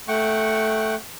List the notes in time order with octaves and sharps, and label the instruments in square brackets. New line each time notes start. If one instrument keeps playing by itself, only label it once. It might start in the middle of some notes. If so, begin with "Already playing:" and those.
[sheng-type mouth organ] A3 F#5 G5 C#6